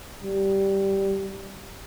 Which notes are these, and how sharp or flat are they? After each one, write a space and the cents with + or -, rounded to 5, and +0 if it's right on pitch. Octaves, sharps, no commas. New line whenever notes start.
G3 -10